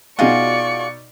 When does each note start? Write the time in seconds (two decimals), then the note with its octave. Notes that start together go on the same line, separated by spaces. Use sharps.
0.19 B2 D#4 F4 F#4 G#4 D5 F#5 C#6